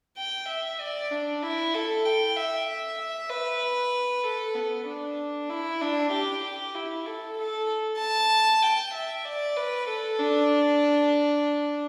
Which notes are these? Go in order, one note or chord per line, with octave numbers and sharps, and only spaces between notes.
G5
E5
D5
D4
E4
A4
G5
E5
E5
B4
A4
B3
D4
E4
D4
G4
G4
E4
A4
A4
A5
G5
E5
D5
B4
A4
D4